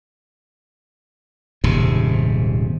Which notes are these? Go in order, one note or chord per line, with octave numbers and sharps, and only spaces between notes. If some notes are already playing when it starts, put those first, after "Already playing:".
D#1 G#2 C3